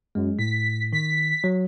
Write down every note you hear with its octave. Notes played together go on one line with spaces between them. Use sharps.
F#2 G#3
A2 B6
D#3 B6
F#3